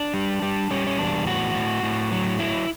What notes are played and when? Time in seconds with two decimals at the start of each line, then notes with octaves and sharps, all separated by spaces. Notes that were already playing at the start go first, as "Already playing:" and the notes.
Already playing: D4
0.14 G3
0.42 G3
0.71 G3 C#4
0.87 C#4
0.98 E2 D4
1.27 A2 F#4
1.54 A2
1.83 A2
2.12 F#3
2.39 F#3 E4